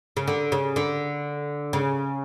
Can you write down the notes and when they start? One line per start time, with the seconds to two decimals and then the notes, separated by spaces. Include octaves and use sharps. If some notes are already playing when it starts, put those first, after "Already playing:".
0.17 C#3
0.28 D3
0.52 C#3
0.76 D3
1.73 C#3